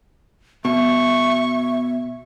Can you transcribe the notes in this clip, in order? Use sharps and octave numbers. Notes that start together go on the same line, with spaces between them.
B2 E5 C#6